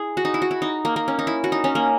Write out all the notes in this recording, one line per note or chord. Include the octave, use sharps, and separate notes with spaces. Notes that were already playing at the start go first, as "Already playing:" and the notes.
Already playing: E4 G#4
F#4
D#4
E4
F#4
E4
D#4
A#3
A#3
C#4
D#4
E4
F#4
D#4
C#4
A#3